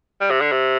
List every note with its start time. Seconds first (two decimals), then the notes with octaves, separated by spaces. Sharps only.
0.21 G3
0.31 C3
0.41 D3
0.52 C3